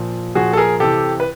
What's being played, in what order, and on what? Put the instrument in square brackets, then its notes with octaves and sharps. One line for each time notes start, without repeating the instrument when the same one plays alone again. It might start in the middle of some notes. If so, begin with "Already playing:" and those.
Already playing: [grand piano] A#2 F3
A#2 F3 F#4 G#4
A4
G#4 A#4
C3 E3 G4 A4
B4